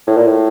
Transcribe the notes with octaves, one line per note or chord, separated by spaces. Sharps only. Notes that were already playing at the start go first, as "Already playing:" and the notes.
A2
A#2
A2